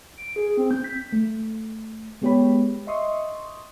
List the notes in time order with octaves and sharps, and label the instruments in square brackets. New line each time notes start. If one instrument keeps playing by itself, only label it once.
[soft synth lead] D7
G#4
C4
G6
B6
[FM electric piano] A3
G#3 B3 G4 C#5 G5 B5
D#5 E5 C6 C#6 D#6